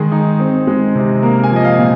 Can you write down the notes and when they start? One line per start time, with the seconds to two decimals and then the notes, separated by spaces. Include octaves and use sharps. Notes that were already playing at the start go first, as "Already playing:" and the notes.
Already playing: D#3 G#3 G#4
0.12 D#4
0.40 C4
0.67 G#3
0.95 C3
1.22 A#3 A#4
1.43 G#5
1.51 F3
1.56 D#5
1.64 F5
1.79 A#2